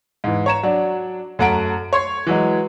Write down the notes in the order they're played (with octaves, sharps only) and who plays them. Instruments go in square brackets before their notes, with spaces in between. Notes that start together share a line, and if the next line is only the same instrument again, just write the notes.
[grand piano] G#2 E3
C#5 A#5 E7
F#3 D4
F#2 A3 F#5 A#5 D7
C#5 C6
E3 F#3 G#3